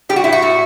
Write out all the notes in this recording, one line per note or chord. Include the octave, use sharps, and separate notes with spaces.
G3 G4
F#4
A2 E4
F#4
A2